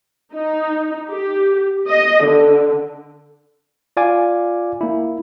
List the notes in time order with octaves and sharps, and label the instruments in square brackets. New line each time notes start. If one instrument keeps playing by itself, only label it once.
[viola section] D#4
G4
D#5
D3
[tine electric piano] F4 D5 F5 G#5 D6
A#3 E4